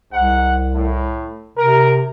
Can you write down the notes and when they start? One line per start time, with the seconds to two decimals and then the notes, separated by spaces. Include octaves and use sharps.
0.13 C2 G#2 F#5
0.74 A2
1.58 C3 A#4